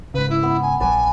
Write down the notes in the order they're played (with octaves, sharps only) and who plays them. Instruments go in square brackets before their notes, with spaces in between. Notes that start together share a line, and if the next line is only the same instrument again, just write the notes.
[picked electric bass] G#2 C#3 [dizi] B4
[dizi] E4
[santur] B3
[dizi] G#5
[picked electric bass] A#1 F3 F#3 [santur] B4 D5 A5 [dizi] G#5